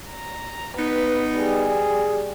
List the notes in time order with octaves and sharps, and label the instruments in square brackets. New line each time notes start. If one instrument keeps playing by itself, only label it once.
[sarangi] A#5
[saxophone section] B3 D#4 [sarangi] B4
[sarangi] G3 [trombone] G#4